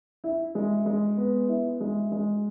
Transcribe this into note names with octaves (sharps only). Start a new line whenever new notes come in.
E4
G#3
G#3
B3
E4
G#3
G#3